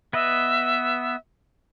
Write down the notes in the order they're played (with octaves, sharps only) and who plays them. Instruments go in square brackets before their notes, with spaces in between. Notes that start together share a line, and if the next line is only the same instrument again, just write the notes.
[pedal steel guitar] B3 B4 D#5 [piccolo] E5